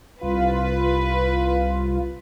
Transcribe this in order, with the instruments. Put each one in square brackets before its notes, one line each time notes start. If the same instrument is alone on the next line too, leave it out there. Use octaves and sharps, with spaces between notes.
[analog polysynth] C2 F4 [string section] B4